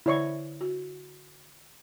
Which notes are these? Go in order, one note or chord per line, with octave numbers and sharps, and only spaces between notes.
D3 E4 C#5 D5 C#6
F#4